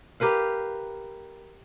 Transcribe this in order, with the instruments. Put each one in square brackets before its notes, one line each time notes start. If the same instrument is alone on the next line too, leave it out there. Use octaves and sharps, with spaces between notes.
[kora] G4 A#4 B4 F5